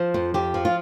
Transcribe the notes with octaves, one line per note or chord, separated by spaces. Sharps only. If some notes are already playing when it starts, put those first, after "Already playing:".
Already playing: F3 C5
F2
F2 G4
F3
F4